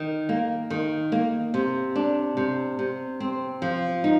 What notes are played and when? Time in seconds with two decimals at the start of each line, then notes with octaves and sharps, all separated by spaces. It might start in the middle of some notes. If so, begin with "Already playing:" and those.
Already playing: D#3
0.29 A#3
0.70 D#3
1.12 A#3
1.54 C3
1.95 D4
2.37 C3
2.79 C3
3.20 C4
3.62 F3
4.04 D#4